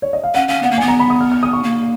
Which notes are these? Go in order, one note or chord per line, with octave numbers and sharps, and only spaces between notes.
C#5
D#5
F5
C#4 F#5
C#4 F5
B3 F#5
A#3
B3 G#5
A#5
B5
D#6
F6
F6
D#6
C#6
A#3